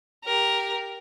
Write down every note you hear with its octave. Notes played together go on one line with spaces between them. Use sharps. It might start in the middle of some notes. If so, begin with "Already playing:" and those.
G4 A#4